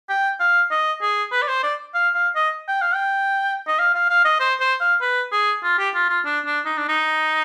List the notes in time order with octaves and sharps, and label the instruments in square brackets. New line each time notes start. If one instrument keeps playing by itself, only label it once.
[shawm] G5
F5
D#5
G#4
B4
D5
C5
D5
F5
F5
D#5
G5
F5
G5
D#5
F5
F5
F5
D#5
C5
C5
F5
B4
G#4
F4
G4
F4
F4
D4
D4
D#4
D4
D#4